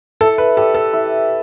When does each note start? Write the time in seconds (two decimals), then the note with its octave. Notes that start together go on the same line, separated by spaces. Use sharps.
0.21 E4 A4
0.38 B4
0.57 G4 A4
0.61 D5
0.74 A4
0.93 E4